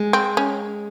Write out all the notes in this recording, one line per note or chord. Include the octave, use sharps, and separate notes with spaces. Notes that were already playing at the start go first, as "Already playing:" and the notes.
Already playing: G#3
C4
C#4